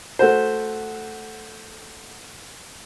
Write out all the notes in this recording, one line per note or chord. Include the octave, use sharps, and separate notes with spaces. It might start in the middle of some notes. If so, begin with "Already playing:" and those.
A3 F#4 C5